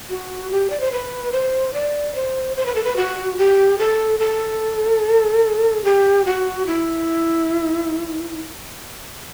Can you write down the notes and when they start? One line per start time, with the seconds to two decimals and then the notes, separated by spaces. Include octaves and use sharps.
0.10 F#4
0.51 G4
0.70 D5
0.80 C5
0.92 B4
1.32 C5
1.74 D5
2.15 C5
2.57 C5
2.66 B4
2.75 A4
2.84 B4
2.96 F#4
3.37 G4
3.78 A4
4.19 A4
5.84 G4
6.25 F#4
6.66 E4